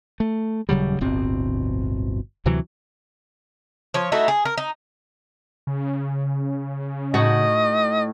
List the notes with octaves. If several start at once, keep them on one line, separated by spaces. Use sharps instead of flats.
A3
D#1 C#3 F#3 G3
D1 G1 B2 C4
D2 C3 E3 F#3
F3 C#5
A3 D#4 E4 F#4
G#4
A#4
D#4
C#3
A2 D#4 F#4 D#5